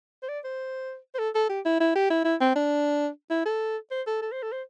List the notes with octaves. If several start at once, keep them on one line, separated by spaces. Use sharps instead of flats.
C5
D5
C5
C5
A4
A4
G4
E4
E4
G4
E4
E4
C4
D4
E4
A4
C5
A4
A4
C5
A4
C5